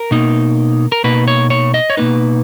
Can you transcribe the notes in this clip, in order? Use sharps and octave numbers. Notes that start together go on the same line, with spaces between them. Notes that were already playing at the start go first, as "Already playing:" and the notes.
Already playing: A#4
B2 A#3 D#4
A#4
B2 A#3 D#4 B4
C#5
C#5
D#5
C#5
B2 A#3 D#4 B4